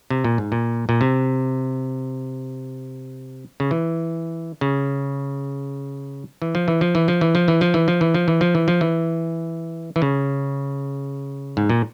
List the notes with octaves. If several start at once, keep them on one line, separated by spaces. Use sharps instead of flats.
C3
A#2
G#2
A#2
A#2
C3
C#3
E3
C#3
E3
F3
E3
F3
E3
F3
E3
F3
E3
F3
E3
F3
E3
F3
E3
F3
E3
F3
E3
E3
C#3
G#2
A#2